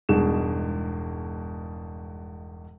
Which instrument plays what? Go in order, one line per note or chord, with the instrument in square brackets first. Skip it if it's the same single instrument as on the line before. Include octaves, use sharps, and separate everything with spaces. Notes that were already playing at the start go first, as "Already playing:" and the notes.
[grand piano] E1 G2 B2 G#3 D#4 E7